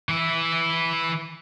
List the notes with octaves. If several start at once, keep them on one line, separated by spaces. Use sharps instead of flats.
E3 E4